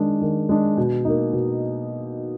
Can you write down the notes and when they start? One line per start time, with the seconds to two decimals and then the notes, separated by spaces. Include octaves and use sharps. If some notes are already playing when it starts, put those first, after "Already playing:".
Already playing: D#3 G#3 D4
0.21 D#3
0.49 G#3 D4
0.77 B2
1.05 A#3 D#4
1.33 B2